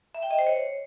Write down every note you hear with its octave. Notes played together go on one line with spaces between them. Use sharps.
E5
G5
D#5
C5
C#5